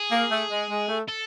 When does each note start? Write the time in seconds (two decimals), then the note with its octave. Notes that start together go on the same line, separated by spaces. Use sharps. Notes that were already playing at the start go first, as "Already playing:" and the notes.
Already playing: G#4
0.11 A#3
0.30 A3
0.50 G#3
0.70 G#3
0.89 A3
1.08 A4